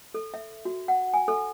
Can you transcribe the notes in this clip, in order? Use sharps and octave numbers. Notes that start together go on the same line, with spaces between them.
A4
E5
F#4
F#5
G#5
A4